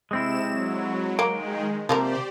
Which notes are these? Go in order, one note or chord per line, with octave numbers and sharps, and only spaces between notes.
C3 G#3 C4 E4 E7
F#3
D#3 G#3 A#3 G5
C3 F3 A#3 G4 A#4 C5 D5